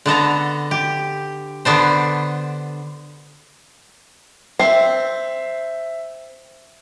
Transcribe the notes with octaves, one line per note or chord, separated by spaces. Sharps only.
D3 B3 A4 A#5
G4
D3 B3 D4 C5
C4 E5 C7